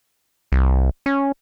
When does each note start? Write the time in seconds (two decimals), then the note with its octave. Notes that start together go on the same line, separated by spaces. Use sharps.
0.52 C2
1.06 C#4